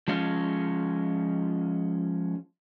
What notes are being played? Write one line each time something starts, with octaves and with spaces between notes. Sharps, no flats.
F3 G#3 C#4 F4